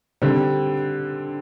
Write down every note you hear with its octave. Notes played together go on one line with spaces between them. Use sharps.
D3 G3 C4